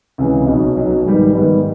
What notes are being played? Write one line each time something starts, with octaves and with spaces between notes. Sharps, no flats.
C#2 C3 E3
B1 B2 F#3
B1 B2 F#3
G#2 D#3 G3 B3
G#2 D#3 G3 B3